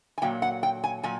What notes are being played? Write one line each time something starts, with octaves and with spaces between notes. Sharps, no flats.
G#5
A#2 F#3 A#3 G5
F#5
G5
G#5
A#2 F#3 G#5